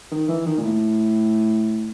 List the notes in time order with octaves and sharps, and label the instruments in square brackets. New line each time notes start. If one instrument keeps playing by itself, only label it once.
[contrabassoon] D#3
E3
D#3
A#2
A2